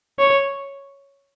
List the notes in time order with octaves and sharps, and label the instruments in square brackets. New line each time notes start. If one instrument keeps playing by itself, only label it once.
[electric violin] C#5